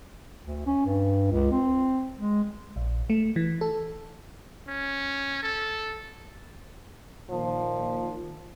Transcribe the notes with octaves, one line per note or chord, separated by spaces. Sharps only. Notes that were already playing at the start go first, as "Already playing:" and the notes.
D2
C#4
G2
C#2
C4
G#3
A#1
A3
E3
A4
C#4
A4
A#2 D#3 F3